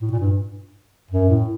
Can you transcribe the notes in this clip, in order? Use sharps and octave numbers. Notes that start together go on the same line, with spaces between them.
A2
A#2
G2
F#2
A2